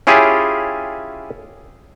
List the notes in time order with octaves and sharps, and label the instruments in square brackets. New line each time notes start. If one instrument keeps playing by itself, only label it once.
[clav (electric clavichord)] C#4 E4 F4 G4 G#4